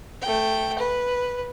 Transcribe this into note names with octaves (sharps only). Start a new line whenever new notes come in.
A3 G5
B4